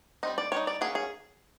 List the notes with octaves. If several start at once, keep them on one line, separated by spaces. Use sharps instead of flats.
G3 C4 D#4 D#5
D5
G3 C4 D#4 C#5
D5
F#3 A#3 C#4 G#4
G#4